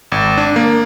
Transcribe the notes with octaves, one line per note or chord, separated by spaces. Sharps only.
G#1
D4
A#3